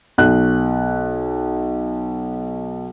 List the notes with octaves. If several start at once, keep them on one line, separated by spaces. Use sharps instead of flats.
B1 F#6